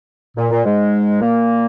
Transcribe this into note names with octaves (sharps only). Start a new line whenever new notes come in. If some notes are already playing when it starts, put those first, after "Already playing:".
A#2
A#2
G#2 G#3
A#2 A#3